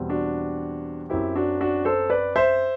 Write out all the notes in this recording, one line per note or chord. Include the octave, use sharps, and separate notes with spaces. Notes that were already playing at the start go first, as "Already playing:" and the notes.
Already playing: E2 B2 G3 C4
D4 F#4
F#2 F#3 C4 E4 G4
D4 F#4
D4 F#4
A4 C5
B4 D5
C5 E5